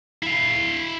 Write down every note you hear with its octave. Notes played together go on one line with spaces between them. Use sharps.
E4 F5